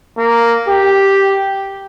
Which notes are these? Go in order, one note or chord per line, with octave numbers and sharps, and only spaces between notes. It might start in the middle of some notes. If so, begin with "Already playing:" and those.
A#3
G4